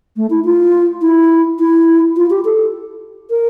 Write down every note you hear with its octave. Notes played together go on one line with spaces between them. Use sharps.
A3
E4
F4
E4
E4
F4
G4
A4
A#4